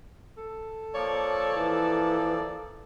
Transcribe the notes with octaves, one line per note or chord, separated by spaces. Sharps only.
A4
F3 A#3 C#5 D5
E3